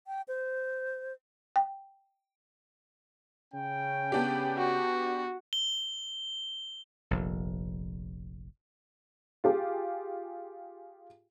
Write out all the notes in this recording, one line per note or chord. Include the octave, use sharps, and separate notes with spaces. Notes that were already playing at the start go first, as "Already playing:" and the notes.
G5
C5
G5
C#3 C#4 G5
B3 D4 G4
F#4
G7
F1 A#1
F4 G4 G#4